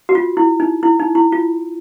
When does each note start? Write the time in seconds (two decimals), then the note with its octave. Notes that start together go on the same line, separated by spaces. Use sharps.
0.09 F#4
0.15 F4
0.37 E4
0.60 D#4
0.83 E4
0.99 D#4
1.15 E4
1.32 F4